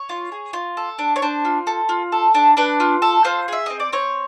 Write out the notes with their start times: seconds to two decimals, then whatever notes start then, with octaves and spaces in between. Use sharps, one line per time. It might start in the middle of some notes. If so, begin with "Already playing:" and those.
Already playing: C#5
0.09 F4
0.32 G#4
0.53 F4
0.77 A4
0.99 D4
1.16 C#5
1.22 D4 C5
1.45 F4
1.67 A4
1.89 F4
2.12 A4
2.35 D4
2.57 D4 B4
2.80 F4
3.02 A4
3.25 F4 C5
3.48 G#4 E5
3.66 C4 D#5
3.80 D5
3.92 C4 C#5